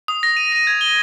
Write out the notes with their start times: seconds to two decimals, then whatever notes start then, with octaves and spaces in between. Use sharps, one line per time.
0.08 D#6
0.23 A#6
0.37 D#7
0.52 D#7
0.67 G#6
0.81 G7